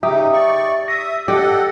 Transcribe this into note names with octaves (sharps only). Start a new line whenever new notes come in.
C#3 D#4 G4 E5 D#6
D5 C#6
E5 D#6 A#6
G4 A4 D5 D#5 F#5